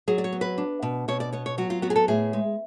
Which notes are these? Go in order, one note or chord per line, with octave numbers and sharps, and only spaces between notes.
F#3 G#4
D5
C#5
B3
B4
D4
B2
B2 C#5
D5
B3 C#5
C#5
F#3 F#4
F4
B3 F#4
G#4
A4
A2 G#4
G#3